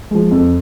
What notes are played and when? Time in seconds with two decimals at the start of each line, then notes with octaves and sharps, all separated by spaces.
0.11 F3 G#3
0.31 F2